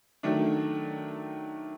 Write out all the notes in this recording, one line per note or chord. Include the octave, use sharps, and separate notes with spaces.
D#3 F#3 A3 D4